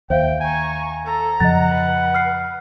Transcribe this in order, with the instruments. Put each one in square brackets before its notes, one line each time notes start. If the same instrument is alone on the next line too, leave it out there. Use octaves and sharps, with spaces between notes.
[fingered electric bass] D#2 [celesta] C5 E5 F5 [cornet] G5
[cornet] G#5 [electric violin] A#5 C#6
[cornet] A4 [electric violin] A#5
[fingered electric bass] F2 C#3 F3 [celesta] D#5 A6 [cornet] F#5
[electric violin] B4
[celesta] F6 C7